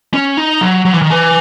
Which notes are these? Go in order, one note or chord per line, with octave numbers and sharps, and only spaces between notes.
C#4
D#4
F#3
F#3
E3
D#3
E3